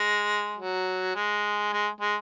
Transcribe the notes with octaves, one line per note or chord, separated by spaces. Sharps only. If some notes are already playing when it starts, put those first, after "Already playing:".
Already playing: G#3
F#3
G#3
G#3
G#3